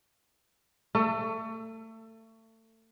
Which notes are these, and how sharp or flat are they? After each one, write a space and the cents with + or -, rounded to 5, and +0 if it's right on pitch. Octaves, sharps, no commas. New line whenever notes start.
A3 +30 A4 +20